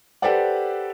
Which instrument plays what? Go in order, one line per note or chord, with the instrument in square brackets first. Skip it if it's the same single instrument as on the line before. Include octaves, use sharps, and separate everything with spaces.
[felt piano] G4 A4 B4 C5 D5 F#5